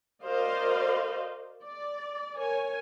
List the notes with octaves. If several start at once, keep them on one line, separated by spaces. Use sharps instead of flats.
F#4 A#4 C5 D5 D#5 F5
D5
A#4 C#5 G#5